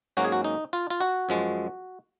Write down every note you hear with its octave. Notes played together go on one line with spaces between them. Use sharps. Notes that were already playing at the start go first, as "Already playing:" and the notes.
G#2 F#3 A#3 C#4 F#4
G#4
F#4
D#4
F4
F4
F#4
F#2 F3 G#3